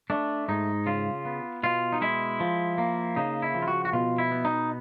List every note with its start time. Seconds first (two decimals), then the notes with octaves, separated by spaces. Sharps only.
0.10 A3 D4
0.48 G#2 D#4
0.86 C#3 F4
1.25 B3
1.63 B2 F4
1.93 D#4
2.01 G#3 E4
2.40 F3
2.78 A#3
3.16 C#3 D#4
3.42 E4
3.55 F3
3.62 F4
3.68 F#4
3.85 F#4
3.93 B2 F4
4.18 E4
4.31 B3
4.45 D#4